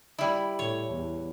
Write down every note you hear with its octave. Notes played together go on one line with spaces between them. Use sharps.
G3 E4
A2 C#5
E2